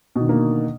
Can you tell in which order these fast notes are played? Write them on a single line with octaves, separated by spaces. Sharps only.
B2 D#3 D3 A#3